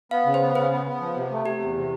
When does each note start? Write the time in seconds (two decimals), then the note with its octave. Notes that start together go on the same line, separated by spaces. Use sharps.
0.11 B3 F5
0.26 C#3
0.34 C5
0.41 B3
0.55 C#3 B4
0.71 B3
0.86 B3
1.01 F3
1.16 C3
1.31 A3
1.46 C3 G4
1.61 E2
1.75 C3